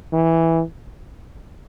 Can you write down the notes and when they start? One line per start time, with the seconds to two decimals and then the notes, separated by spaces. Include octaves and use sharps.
0.13 E3